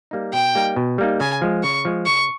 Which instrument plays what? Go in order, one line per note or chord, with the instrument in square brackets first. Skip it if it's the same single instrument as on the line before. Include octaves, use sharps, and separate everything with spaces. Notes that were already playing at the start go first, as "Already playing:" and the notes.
[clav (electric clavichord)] G3 A#3 D#4
[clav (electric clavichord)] B2 [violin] G5
[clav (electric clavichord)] G3 A#3 D#4
B2
G3 A#3 D#4
[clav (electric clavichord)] C#3 [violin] G#5
[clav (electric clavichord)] F3 G#3
[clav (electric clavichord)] C#3 [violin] C#6
[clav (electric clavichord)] F3 G#3
[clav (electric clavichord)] C#3 [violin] C#6